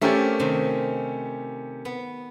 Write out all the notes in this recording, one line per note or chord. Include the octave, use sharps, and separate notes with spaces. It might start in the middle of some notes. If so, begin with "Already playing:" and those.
A3 C4 C#4 G4 A#4 D5
C3 D#3
B3